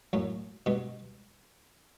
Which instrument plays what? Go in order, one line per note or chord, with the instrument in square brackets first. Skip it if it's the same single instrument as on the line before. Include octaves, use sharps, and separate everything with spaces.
[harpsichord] F#2 A2
G2 B2